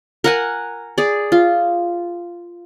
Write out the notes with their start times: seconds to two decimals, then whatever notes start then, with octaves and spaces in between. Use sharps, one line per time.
0.24 A#4 F#5 G#5
0.98 G#4 D5
1.32 F4